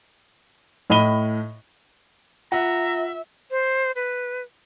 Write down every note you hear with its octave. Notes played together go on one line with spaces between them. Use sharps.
A2 D#5 B5 D#7 G7
F4 E5 F#5 A#5
C5
B4